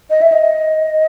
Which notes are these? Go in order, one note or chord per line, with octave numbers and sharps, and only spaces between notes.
D#5
E5
D#5